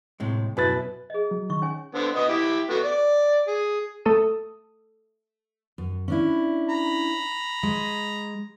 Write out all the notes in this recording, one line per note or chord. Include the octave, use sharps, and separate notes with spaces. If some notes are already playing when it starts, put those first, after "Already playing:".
A2 C3 G#3
F#2 B2 E4 B4 A6
G#4 D#5
F#3
D#3 C#6
C#4 C#5 G#5
D3 B3 C4
B3 D#5
E4 G4
A3 B3 F#4
D5
G#4
A3 A4 D#6
F#2
C#4 D4 E4
A#5 B5
G#3